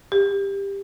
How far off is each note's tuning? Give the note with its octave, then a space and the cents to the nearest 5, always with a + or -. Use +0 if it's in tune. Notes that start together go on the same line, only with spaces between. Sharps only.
G4 +15